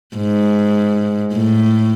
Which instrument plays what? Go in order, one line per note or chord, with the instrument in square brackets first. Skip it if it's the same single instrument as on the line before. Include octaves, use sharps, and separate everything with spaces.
[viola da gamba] G#2
A2